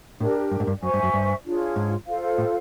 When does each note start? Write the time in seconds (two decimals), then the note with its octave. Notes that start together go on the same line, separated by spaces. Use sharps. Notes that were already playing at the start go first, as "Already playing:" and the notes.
0.20 A2 D4 G4 A#4
0.51 G2
0.60 G#2
0.67 G2
0.83 F#2 C5 E5 G#5 C#6
0.94 G2
1.03 F#2
1.14 G2
1.45 D4 F4 G#4 C#5
1.76 G#2
2.07 F4 A4 C5 F5
2.38 A2